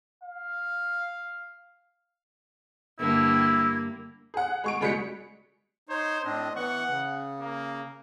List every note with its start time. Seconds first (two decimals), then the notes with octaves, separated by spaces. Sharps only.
0.23 F5
2.99 G2 D3 A#3 E4 G4
4.34 G#4 F#5
4.64 G#3 C#6 D7
4.81 C#2 G3 G#3 F#4 B6 C#7
5.89 D#4 C5 C#5
6.25 A2 C4 D4 D#5
6.56 E3 B3 F#5 C#6
6.89 C#3
7.40 A#3